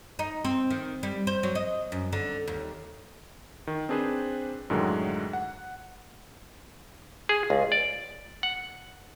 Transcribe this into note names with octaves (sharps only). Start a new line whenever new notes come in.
D#4
C4
D#3
G3
C5
F#3
D#5
F#2
D3
D#2
D#3
C4 D4 G#4 B4 C5
F#2 A2 D3 D#3 F#3 G#3
F#5
G#4
C#2
D5
F#5